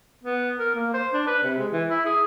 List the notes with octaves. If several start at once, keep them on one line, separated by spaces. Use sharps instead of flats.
B3
A#4
A#3
C5
D4
B4
C3
G#3
E3
E4
G#4